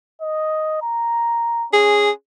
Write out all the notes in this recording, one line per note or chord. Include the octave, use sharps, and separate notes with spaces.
D#5
A#5
C#4 G#4